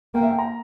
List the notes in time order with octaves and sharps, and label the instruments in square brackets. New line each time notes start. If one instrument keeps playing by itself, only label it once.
[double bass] A#3 [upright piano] G5
[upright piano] E5
G5
A#5